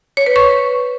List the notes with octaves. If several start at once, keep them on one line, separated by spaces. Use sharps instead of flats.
C#5
B4
C#6